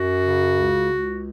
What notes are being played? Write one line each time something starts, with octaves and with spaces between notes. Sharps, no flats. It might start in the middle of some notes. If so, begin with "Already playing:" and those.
Already playing: F#2 F#4
C#3
C#2
C#2